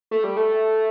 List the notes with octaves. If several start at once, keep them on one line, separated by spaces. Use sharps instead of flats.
A3
G3
A3